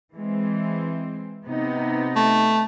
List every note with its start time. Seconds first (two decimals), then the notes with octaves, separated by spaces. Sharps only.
0.14 E3 G#3 C4
1.45 C3 B3 D#4
2.16 A3